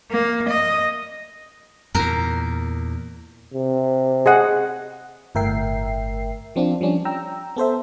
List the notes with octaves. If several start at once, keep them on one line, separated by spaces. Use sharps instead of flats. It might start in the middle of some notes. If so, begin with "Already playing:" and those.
A#3
D#5
E2 A#2 A#4
C3
G#4 D#5 F#5
G1 A2 A#4 E5 G5 C7
F3 C4 D4 F4
F3 G3 C#4 D4
G5 A#5 E6
B3 A4 C5 E5